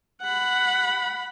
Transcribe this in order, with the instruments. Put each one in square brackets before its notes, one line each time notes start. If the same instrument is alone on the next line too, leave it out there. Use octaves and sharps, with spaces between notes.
[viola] F#5 B5